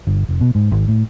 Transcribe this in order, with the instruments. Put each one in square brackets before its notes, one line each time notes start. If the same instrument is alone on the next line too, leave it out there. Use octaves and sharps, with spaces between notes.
[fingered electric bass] G1
F1
B2
G#2
G#1
A2